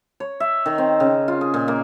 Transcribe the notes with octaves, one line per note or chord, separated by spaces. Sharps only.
C#5
E5
D#3
C4
C#3
F4
G#4
A#2
A#3